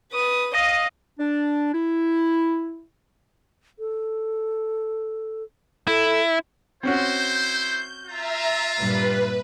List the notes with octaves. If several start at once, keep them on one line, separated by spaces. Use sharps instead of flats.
B4 D#6
D#5 F5 D#6 A#6 D#7
D4
E4
A4
E4 A4
C4 C#4 E4 F#4 C5 G6
F4 E5 A#5
G2 A#2 G3 B4